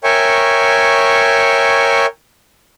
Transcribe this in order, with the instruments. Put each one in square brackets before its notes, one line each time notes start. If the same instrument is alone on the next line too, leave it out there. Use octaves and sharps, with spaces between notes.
[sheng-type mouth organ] A#4 C#5 E5 G5 G#5 C#6